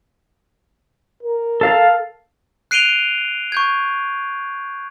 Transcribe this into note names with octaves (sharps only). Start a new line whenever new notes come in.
A#4
A4 F5 A5
F#6 C7 D7 D#7 F7 G7
C#6 G6 G#6